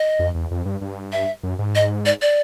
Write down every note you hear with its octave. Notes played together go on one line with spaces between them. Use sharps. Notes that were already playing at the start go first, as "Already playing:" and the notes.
Already playing: D#5
F2
E2
F2
G2
G2
E5
F#2
G#2
D#5
D5
D5